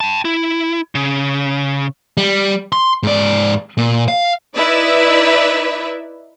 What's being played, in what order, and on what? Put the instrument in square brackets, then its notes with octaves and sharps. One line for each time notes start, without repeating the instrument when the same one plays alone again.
[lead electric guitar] G5 A5
E4
C#3
[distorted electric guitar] G3
C6
G#2 D5
A#2
F5
[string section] D#4 E4 B4 D5 E5